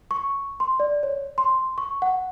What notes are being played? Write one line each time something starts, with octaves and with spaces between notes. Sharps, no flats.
C#6
C6
D5
C#5
C6
C#6
F#5